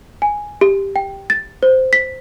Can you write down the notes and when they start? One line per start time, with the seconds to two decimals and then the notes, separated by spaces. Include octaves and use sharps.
0.22 G#5
0.61 G4
0.96 G5
1.30 A6
1.63 C5
1.93 B6